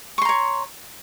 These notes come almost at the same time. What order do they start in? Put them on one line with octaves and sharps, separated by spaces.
C#6 C6 A#5 C#5